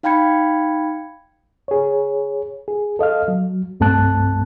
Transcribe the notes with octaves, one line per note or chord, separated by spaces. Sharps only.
D#4 F5 G5 B5 G#6 C#7
G#4 C#5
G#4
A4 D#5 F5 F6
F#3
C2 G2 A3 C4 A5 F#6